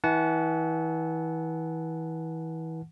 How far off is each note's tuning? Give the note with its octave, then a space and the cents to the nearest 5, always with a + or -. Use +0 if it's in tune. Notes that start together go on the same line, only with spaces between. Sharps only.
E3 -30 F#5 +0 A5 -35